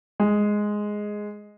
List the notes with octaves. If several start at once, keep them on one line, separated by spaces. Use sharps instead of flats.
G#3